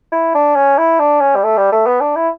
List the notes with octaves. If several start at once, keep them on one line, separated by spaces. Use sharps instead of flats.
E4
D4
C#4
E4
D4
C#4
G3
A3
G3
A3
B3
D4
E4